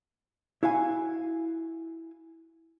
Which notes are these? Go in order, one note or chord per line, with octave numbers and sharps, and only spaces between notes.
E4 F#4 F5 G#5